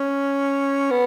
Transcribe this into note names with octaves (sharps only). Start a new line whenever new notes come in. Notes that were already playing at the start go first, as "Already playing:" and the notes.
Already playing: C#4
B3